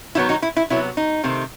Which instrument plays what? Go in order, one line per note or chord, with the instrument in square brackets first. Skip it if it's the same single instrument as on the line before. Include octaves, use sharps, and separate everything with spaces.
[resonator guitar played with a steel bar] D#3 F#3 B3 E4
D#4 F#4
E4
E4
C3 F#3 B3 E4
D#4
C3 D#3 A3 C4